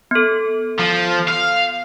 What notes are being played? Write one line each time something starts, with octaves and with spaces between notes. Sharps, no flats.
B3 A4
F3
F5